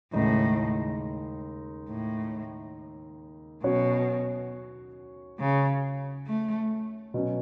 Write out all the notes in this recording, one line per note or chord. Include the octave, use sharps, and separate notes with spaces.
D#2 A2 C#3 G#3 D#4
A2
B2 F#3 C#4 F#4 C#5
C#3
A3
B2 F#3 C#4